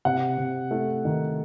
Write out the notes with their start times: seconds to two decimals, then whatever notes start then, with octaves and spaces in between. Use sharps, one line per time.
0.05 C3 F#5
0.38 C3
0.71 A3
1.05 D#3